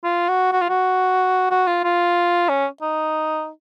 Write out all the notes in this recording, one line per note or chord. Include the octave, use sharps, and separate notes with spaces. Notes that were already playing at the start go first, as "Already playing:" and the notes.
F4
F#4
F#4
F4
F#4
F#4
F4
F4
C#4
D#4